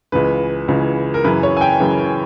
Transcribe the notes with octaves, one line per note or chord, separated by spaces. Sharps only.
C#2 C#3 E3 B4
C#2 C#3 E3
A#4
F#2 C#3 E3 B4
C#5
G#5
G5
F#2 C#3 E3